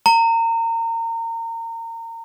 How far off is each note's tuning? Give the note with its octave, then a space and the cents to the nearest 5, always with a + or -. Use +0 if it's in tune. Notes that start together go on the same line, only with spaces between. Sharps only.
A#5 -30